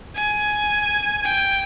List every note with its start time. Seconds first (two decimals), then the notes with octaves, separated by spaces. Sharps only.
0.16 G#5
1.25 G5